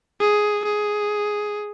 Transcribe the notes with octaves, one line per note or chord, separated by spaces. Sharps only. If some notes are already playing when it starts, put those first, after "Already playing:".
G#4
G#4